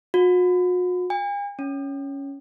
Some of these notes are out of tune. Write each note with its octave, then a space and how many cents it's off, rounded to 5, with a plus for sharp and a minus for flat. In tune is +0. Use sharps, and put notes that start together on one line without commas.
F#4 -45
G#5 -45
C#4 +5